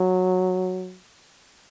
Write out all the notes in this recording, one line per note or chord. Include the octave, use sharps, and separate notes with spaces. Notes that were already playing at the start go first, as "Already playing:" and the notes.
Already playing: F#3